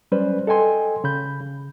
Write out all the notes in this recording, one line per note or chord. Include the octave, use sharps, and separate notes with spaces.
F#3 G3 C#4 B4 C5 D5
A4 D#5 G5 G#5 C6
C#3 B5 G6
C#3